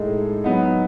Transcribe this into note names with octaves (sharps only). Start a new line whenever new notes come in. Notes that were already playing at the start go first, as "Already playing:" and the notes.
Already playing: A2 G#3 D#4 A4
F#3 B3 D#4